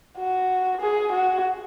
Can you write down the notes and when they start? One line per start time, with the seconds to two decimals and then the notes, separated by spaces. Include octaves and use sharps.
0.19 F#4
0.81 G#4
1.13 F#4